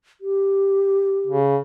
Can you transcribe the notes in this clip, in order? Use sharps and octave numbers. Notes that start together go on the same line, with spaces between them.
G4
C#3